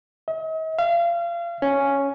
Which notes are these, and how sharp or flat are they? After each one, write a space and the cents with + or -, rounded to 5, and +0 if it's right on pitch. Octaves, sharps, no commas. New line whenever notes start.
D#5 +45
F5 -30
C#4 +0